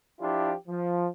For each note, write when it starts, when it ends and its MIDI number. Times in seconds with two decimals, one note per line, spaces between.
0.21 0.53 53
0.21 0.53 62
0.21 0.53 64
0.21 0.53 65
0.21 0.53 67
0.68 1.07 53